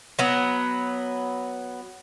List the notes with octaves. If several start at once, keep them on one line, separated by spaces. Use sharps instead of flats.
F#3 B3